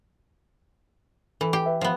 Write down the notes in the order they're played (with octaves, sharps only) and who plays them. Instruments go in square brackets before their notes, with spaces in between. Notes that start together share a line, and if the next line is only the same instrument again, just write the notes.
[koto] E3 [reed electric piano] A4
[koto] G4
[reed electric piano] B4 E5
[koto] F3 B3